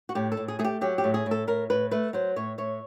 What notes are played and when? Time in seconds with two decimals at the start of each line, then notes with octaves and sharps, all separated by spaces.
0.09 F#4
0.15 A2 G4
0.32 A4
0.37 A2
0.48 G#4
0.59 A3 G#4
0.64 G4
0.81 F#3 G4
0.98 G4
1.04 A2
1.14 G#4
1.26 A2
1.31 A4
1.47 A2 A#4
1.70 A2 B4
1.91 A3 B4
2.13 F#3 C5
2.36 A2 C#5
2.58 A2 C#5